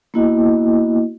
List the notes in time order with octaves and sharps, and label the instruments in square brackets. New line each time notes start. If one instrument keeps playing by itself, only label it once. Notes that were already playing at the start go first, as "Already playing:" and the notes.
[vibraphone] A#3 B3 E4 F#4 D#5